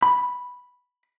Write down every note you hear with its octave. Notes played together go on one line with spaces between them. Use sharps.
B5